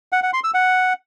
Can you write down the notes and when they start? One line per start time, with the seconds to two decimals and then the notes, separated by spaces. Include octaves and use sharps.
0.12 F#5
0.23 F#5
0.33 C6
0.44 E6
0.54 F#5